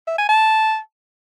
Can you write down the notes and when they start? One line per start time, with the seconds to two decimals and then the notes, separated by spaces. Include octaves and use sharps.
0.07 E5
0.18 G#5
0.29 A5